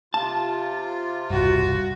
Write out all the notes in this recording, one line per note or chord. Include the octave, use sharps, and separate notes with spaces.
C3 F4 A5
E1 C2 G2 F#4